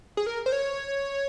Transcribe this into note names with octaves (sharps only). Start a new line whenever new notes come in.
G#4
A#4
C5
C#5